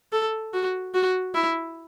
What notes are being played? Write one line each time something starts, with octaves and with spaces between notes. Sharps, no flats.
A4
F#4
F#4
E4